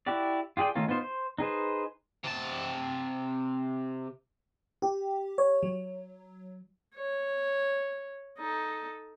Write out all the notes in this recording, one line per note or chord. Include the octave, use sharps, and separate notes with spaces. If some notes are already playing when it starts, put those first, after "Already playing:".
E4 F#4 G4 D5
F4 G4 G#4 D5 G5
D#3 A3 C#4 D#4 F4
B3 D#4 F4 C5
C5
D#4 G#4 B4 C5
C3 A5
G4
C#5
F#3
C#5
D#4 A4